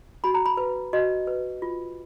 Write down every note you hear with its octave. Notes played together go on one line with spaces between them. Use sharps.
F#4 B5
A#5
B5
B4
F#4 D#5
B4
F4